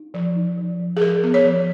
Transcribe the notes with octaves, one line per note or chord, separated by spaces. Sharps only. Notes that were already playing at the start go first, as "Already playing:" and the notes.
Already playing: D#4
F3
D#4
F3
F3
G#4
F3 A#4
B3
C#5
F3